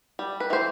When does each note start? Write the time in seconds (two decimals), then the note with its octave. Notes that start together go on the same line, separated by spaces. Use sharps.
0.19 G3
0.40 B4
0.50 E3 C5